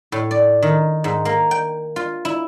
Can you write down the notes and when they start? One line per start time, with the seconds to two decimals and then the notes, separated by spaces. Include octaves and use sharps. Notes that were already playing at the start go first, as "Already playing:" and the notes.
0.12 A2
0.31 D5
0.62 D#3
1.04 G#2
1.25 A#3
1.51 G5
1.96 F4
2.25 E4